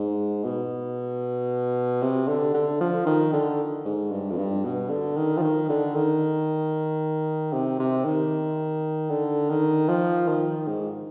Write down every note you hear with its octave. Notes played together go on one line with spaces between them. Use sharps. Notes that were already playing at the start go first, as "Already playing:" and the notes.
Already playing: G#2
B2
C3
D3
D3
F3
D#3
D3
G#2
G2
F2
G2
B2
D3
D#3
F3
D#3
D3
D#3
C3
C3
D#3
D3
D#3
F3
D#3
G#2